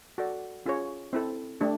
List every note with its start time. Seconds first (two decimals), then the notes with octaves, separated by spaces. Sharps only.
0.18 F#4 A4 D5
0.66 C#4 F4 G#4 C#5
1.13 C4 E4 A4
1.61 A3 D4 G4